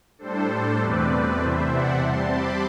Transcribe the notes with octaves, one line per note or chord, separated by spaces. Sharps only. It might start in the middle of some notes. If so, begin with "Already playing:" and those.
A2 G3 D4 A4 C5
A4 C5
E2 B2 A3 C4 B4 D5
E2 C3 E3 C5 E5
D5 F#5
C3 G3 C4 A5 C6
B5 D6